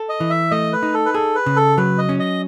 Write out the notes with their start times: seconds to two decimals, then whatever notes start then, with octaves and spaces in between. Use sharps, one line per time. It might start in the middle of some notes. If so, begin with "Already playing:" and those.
Already playing: A4
0.09 D#5
0.20 E3
0.30 E5
0.51 A3 D#5
0.73 B4
0.83 D#4
0.94 A4
1.06 B4
1.14 G#4 A4
1.36 B4
1.46 C#3
1.56 A4
1.78 F#3 B4
1.98 D#5
2.09 C#4
2.20 D#5